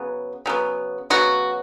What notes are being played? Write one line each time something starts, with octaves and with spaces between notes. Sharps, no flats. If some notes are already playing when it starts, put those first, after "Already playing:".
Already playing: C#3 F#3 B3
C#3 F#3 B3
C#3 F#3 B3 F#4